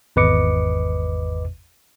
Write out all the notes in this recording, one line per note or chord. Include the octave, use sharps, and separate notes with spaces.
G#1 E2 B4 D#5 D6 C#7